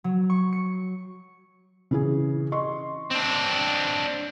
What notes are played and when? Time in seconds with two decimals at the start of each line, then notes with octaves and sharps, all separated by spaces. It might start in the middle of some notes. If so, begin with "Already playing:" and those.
0.04 F#3
0.30 C#6
0.53 C#7
1.91 C#3 E3 G#4
2.52 D#5 C6 C#6
3.10 C4 D4